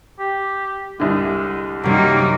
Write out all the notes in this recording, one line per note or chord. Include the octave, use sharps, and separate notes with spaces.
G4
C2 D3 G#3
F#2 C3 G3 A#3 D#4